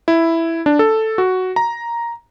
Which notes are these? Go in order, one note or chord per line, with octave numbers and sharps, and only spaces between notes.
E4
D4
A4
F#4
A#5